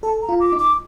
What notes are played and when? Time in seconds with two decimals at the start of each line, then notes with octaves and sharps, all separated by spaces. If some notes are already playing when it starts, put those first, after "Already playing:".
0.03 A4 A5
0.22 A#5
0.29 F4
0.40 D6
0.52 D#4
0.59 D6